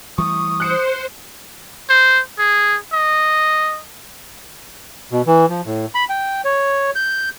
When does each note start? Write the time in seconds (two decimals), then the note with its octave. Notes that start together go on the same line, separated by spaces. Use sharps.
0.18 E3 G3 A3 C#6 D#6
0.60 C5 F#6 C#7
1.90 C5
2.39 G#4
2.93 D#5
5.12 B2
5.27 E3
5.49 F3
5.66 A2
5.95 B5
6.09 G5
6.45 C#5
6.95 G6